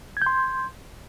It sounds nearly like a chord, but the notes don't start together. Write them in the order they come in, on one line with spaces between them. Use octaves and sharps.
G#6 G6 C6